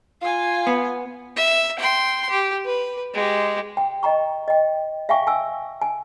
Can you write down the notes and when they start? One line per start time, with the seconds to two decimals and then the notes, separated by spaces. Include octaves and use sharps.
0.21 F4 F5 G#5
0.67 B3
1.36 E5
1.79 G5 C6
2.30 G4
2.65 B4
3.14 G#3 G4
3.77 G5
4.03 D#5 G5 A#5 C#6
4.48 D#5 G5
5.09 E5 F5 G5 G#5 C#6
5.27 G#5 E6
5.82 G#5